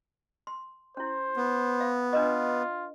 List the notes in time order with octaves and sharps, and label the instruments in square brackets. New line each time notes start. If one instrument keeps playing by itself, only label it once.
[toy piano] C6
[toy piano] C#4 E4 [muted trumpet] C5
[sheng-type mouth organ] B3
[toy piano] F5
[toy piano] D4 B4 D#5 [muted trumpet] F4